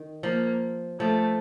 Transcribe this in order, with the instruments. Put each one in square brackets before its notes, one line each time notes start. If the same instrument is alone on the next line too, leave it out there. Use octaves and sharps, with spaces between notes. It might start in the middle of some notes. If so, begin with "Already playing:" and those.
Already playing: [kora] D#3
[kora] F3 [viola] A#3
[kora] F3 [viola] A3